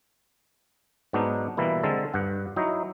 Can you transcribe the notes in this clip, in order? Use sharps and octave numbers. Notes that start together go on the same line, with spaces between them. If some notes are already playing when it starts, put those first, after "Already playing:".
G#2 F#3 B3 D4 D#4
B2 E3 G3 A#3 E4
D3 G#3 C4 A4 A#4
G2 F#5
F#3 D#4 E4